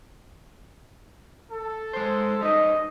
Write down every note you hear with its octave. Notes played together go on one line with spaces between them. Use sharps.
A4
G#3 C5
G3 D#4 D#5